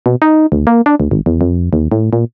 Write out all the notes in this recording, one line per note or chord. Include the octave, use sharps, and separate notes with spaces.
B2
D#4
D2
A#3
D4
D2
G#1
E2
F2
D#2
A2
A#2